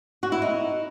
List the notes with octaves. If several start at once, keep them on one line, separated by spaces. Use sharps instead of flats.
F#4
E4
D#4